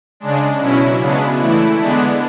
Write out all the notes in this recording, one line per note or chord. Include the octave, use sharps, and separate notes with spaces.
C#3 G#3 D4
B2 F#3 C#4 E4
C#3 G#3 B3 D4
E3 A3 E4
D3 G#3 B3 D4